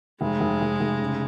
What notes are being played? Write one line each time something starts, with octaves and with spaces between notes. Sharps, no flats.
F1 G#3
F1
F1
F1
C#3